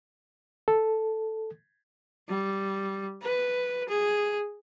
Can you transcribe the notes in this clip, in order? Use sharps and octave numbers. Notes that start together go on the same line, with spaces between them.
A4
G3
B4
G#4